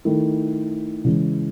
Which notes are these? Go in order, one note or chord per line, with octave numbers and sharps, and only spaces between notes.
D#3 A3 E4
C#3 E3 G#3